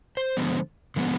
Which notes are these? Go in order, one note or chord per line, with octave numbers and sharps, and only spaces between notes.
C5
D3 F3 G#3 B3
D3 F3 G#3 B3